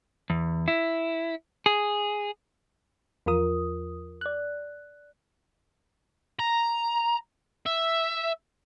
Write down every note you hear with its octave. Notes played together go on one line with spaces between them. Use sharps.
E2
E4
G#4
E2 F3 F4 A#4 D#6
D5 F#6
A#5
E5